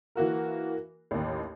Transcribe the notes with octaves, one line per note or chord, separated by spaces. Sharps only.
E3 A#3 F#4 A#4
A1 D#2